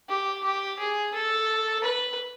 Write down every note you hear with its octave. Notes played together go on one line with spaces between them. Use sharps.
G4
G4
G#4
A4
B4